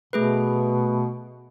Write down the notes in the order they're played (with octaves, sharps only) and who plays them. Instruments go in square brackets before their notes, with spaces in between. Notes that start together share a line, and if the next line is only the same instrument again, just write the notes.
[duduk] B2 [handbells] A3 G#4 B4